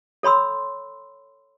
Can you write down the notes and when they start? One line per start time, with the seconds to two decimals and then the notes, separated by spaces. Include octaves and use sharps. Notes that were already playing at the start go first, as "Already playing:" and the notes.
0.23 A4 C#5 B5 C6 E6